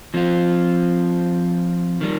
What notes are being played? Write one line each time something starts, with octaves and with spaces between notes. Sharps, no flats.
F3 C4 F4
D#3 G3